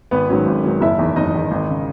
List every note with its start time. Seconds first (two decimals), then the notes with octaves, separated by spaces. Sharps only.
0.11 G#1 B3 B4
0.29 G#2 D#3 F#3 C#4
0.46 G#1
0.64 G#2 D#3 F#3 C#4
0.81 F#1 E4 E5
0.98 E2 D#3
1.16 F#1 D#4 D#5
1.34 E2 D#3
1.51 G#1
1.70 C#3